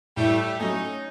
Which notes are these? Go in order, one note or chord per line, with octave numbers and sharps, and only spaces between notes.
A2 G3 A3
F#3 A3 C#4 D#4